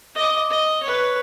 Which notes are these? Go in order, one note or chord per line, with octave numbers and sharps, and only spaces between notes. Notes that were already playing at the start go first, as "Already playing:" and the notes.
D#5 D6
D#5
B4 C#5